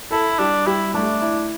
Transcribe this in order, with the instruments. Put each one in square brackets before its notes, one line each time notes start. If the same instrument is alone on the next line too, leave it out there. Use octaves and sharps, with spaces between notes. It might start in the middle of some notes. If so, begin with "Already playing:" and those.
[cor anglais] E4 [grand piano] A4
[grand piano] G3 [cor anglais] D4
[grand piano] G3 [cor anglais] E4
[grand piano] A3 [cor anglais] D4
[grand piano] E4